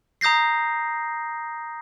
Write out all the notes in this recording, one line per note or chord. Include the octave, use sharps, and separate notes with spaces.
A#5 D#6 G6 A#6 C7